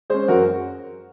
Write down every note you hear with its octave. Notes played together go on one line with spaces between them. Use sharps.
G#3 C#4 G#4 C5
F#2 F#4 A#4